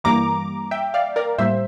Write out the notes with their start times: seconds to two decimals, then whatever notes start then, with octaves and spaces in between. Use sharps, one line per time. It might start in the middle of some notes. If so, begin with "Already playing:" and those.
0.04 G2 E3 G3 A#3 A#5 D6
0.71 E5 G5
0.94 D5 F5
1.16 A#4 D5
1.38 A2 G3 A#3 C5 E5